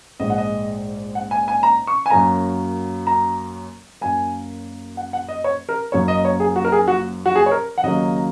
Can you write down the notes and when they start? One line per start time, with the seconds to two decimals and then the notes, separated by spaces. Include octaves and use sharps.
0.20 A#1 G#2 G#3 D#5
0.30 F#5
0.38 D#5
1.15 F#5
1.31 G#5
1.48 G#5
1.63 A#5
1.87 C#6
2.06 G#5
2.10 F#2 F#3 A#3 A#5
3.07 A#5
4.01 F#2 F#3 A#3 G#5
4.97 F#5
5.13 F#5
5.29 D#5
5.44 C#5
5.69 A#4
5.92 F#1 F#2 F#3 A#3 C#5
6.08 D#5
6.25 C#5
6.40 G#4
6.56 F#4
6.65 A#4
6.72 G#4
6.88 F#4
7.26 F#4
7.35 G#4
7.46 C#5
7.52 A#4
7.78 F#5
7.83 D#2 C#3 F#3 A#3 D#5